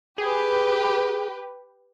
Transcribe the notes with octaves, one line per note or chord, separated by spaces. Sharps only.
G4 G#4 B4